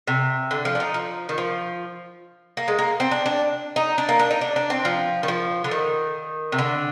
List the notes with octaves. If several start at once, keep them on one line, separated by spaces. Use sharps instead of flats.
C3
D3
F3
D4
D#4
F3
D#3
F3
A#3
G#3
A#3
C4
D4
D4
D#4
D4
A#3
D4
D#4
D4
D4
C4
F3
D#3
F3
D3
D#3
C3
D3